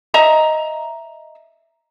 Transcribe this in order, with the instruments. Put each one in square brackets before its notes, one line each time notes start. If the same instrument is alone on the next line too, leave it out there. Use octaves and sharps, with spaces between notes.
[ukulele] D#5 E5 A#5